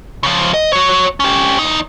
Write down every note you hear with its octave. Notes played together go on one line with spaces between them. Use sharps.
C#3 F3
D#5
F#4 C#5
C#4 G4
E2 D#4